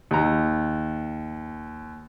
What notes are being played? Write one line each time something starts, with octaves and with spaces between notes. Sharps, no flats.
D#2 A#5